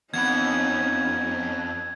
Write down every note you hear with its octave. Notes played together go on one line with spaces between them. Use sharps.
F2 B3 C#4 D#4 F#5 B5 G#6